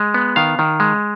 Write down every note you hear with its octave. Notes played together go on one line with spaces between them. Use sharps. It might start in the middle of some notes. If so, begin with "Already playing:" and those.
Already playing: G#3
B3
D#3 F5
D#3
G#3